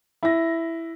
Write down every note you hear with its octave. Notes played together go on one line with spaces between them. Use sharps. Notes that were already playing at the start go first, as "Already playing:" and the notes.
E4 A#6